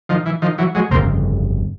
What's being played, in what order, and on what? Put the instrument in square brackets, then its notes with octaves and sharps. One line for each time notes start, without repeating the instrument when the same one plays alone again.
[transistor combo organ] D#3 F3
E3
D#3 F3
E3 F#3
F#3 G#3
[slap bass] G1 F2 C#3 [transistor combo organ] A#3 C4